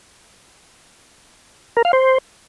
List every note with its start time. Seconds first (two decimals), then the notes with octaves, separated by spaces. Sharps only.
1.77 A#4
1.85 F5
1.93 C5